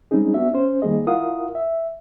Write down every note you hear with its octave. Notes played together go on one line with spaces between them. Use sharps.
G3 G#3 C4 C#4 D#4 G#4
B3 D4 F#4 E5
C#4 C5
D#3 G3 A#3 G#4 D#5
E4 F4 A#4 F5 F#5 D#6
E5